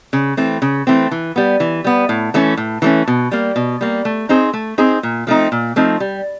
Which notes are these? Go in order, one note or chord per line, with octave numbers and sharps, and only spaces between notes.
C#3
E3 A3 C4
C#3
E3 A3 C4
E3
G3 B3
E3
G3 B3
A2
E3 A3 C#4
A2
E3 A3 C#4
B2
G3 A#3
B2
G3 A#3
A3
C4 D#4 G#4 C5
A3
C4 D#4 G#4 C5
A#2
F3 A3 C4 D#4
A#2
F3 A3 C4 D#4
G3